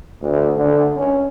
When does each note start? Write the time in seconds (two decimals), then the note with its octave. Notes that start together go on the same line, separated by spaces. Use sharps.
0.22 D2
0.56 D3
0.96 C#4